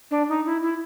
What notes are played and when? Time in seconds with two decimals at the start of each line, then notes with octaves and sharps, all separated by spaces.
0.11 D4
0.29 D#4
0.46 E4
0.62 E4